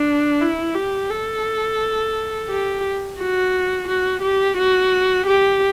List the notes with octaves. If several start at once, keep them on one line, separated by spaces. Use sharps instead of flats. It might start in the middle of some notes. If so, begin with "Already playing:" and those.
Already playing: D4
E4
G4
A4
G4
F#4
F#4
G4
F#4
G4